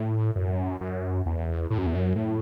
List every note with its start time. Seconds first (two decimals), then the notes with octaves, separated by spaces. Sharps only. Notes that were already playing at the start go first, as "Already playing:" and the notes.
Already playing: A2
0.36 F#2
0.81 F#2
1.26 E2
1.70 A2
1.78 F#2
1.86 E2
1.95 F#2
2.16 A2